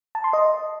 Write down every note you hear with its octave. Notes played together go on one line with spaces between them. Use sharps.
A5
C6
D#5